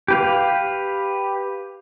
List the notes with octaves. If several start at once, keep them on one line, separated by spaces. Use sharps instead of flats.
G4 B4 F5